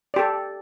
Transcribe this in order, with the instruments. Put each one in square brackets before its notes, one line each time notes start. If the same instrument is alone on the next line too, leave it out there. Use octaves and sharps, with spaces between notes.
[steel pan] D5
G4
A4